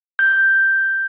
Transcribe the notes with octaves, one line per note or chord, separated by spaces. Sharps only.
G6